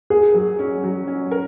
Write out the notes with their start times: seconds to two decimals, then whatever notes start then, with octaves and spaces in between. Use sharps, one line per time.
0.10 G#4 A#4
0.34 F#3
0.59 C#4
0.83 F#3
1.07 C#4
1.31 A#4